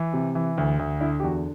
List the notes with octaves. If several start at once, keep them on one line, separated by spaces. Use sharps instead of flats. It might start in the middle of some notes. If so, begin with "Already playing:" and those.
Already playing: E3
C3
E3
D2
D2
D3 E4
G4
E2 F#4